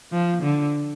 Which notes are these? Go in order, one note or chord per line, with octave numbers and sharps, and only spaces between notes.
F3
D3